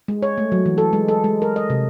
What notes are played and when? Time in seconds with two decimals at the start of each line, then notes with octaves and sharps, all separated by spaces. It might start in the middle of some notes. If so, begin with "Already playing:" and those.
0.08 G#3
0.23 C#5
0.38 A3
0.52 F#3
0.66 E3
0.78 A4
0.93 G#3
1.08 A4
1.24 G#3
1.42 A#4
1.56 D#5
1.70 C3